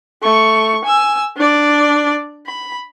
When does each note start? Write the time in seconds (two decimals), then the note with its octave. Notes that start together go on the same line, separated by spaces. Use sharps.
0.23 A3 C#6
0.85 G#5 E6
1.37 D4 D5
2.47 B5